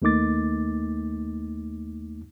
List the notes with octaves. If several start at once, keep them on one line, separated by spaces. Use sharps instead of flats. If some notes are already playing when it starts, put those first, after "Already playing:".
D#2 A3 A#3 D#4 D6 A6